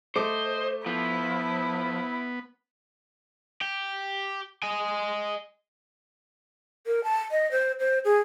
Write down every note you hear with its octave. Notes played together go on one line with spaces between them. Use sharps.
A3 C5 D#5 D6
F3 B3 E4
G4
D#5 G#5
A#4
A5
D#5
C5
C5
G#4